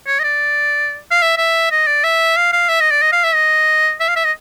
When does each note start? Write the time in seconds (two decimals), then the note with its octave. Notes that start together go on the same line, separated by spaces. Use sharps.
0.07 C#5
0.20 D#5
0.24 D5
1.11 F5
1.22 E5
1.38 E5
1.71 D#5
1.87 D5
2.04 E5
2.37 F5
2.52 F5
2.69 E5
2.80 D#5
2.91 D5
3.02 D#5
3.12 F5
3.24 E5
3.34 D#5
4.00 E5
4.08 F5
4.16 E5
4.24 D#5